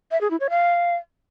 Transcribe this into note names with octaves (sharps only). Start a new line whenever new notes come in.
E5
G#4
E4
C#5
F5